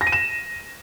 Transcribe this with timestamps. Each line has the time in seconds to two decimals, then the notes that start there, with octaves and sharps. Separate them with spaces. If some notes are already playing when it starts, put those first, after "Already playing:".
0.01 A#6
0.07 D#7
0.12 E7